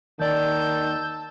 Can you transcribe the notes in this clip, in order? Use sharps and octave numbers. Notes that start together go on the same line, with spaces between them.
D#2 D#3 D5 A5 E6 G6